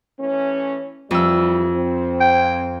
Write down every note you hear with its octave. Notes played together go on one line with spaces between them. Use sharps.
E3 A3 C#4
F2 E3 G3 E6
C4
G5